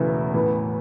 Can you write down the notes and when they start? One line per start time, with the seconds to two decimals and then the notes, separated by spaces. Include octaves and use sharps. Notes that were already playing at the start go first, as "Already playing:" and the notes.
Already playing: E1 E2 C#3 E3 A3
0.34 A2 E3 B3